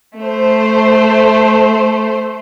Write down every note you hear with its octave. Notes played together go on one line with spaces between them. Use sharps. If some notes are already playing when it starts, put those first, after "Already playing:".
A3 C5